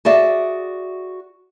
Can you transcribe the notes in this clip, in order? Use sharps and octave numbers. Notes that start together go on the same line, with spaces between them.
F#4 G#4 D5 E5